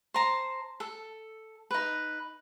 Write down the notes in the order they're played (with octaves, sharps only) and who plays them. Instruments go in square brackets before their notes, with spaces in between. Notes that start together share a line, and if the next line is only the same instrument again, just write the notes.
[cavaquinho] C5 A5 A#5
A4
D#4 B4